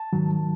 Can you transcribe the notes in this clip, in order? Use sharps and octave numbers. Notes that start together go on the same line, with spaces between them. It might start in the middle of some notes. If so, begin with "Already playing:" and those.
Already playing: A5
G#2 D#3 F#3